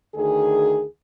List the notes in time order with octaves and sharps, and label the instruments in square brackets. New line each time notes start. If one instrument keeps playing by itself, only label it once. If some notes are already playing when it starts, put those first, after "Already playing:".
[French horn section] D2 D#3 G#4